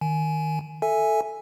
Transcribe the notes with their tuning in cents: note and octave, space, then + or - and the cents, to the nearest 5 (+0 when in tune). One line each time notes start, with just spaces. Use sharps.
D#3 +0 G#5 +15
A4 +0 E5 +0 G#5 +0